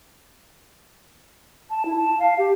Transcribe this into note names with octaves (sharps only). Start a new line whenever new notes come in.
A5
E4
A5
F5
G4